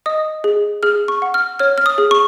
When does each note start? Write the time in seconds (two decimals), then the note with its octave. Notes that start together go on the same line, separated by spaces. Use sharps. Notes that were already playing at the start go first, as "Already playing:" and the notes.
0.06 D#5 D#6
0.44 G#4
0.83 G#4 F6
1.08 C#6
1.22 F#5
1.34 F6
1.59 C#5 F6
1.78 F6
1.86 D#6
1.98 G#4
2.11 C#6